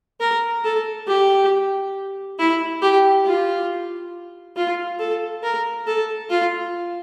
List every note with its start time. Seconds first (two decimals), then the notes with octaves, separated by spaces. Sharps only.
0.20 A#4
0.64 A4
1.07 G4
2.39 E4
2.82 G4
3.25 F4
4.56 F4
4.99 A4
5.43 A#4
5.87 A4
6.30 F4